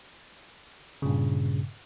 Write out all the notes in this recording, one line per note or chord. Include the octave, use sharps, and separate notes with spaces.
G2 A#2 C#3